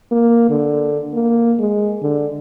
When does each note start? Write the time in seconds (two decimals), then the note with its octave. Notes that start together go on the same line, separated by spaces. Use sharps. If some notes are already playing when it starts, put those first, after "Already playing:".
0.12 A#3
0.49 D3
1.13 A#3
1.59 G#3
2.02 D3